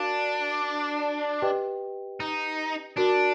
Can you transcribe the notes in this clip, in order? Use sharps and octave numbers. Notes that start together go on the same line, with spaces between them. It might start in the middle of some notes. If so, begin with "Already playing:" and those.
Already playing: D4 F#4 A#4 D5 F5
G4 B4 D#5 G5
D#4
D4 F#4 A#4 D5